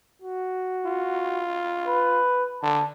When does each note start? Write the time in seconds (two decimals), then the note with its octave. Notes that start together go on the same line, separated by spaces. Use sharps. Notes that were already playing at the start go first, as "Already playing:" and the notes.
0.22 F#4
0.86 F4
1.88 B4
2.63 D3 A5